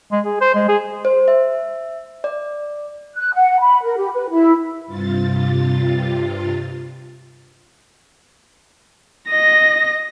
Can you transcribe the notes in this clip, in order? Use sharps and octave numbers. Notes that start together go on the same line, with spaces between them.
G#3
G#4
C5
G#3
G#4
C5
E5
D5
F#6
F#5
B5
A#4
G4
B4
E4
G2 C3 F4 A6
D#5 A#6